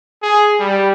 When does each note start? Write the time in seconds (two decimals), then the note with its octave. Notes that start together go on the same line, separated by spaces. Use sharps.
0.22 G#4
0.59 G3